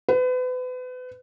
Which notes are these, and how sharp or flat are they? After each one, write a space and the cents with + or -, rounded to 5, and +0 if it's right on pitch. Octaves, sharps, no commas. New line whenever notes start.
B4 +35